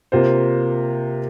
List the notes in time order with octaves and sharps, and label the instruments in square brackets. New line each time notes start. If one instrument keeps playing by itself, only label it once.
[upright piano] C3 A#3 F4 C5